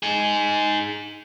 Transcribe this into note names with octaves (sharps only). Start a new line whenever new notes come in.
D#4 G#4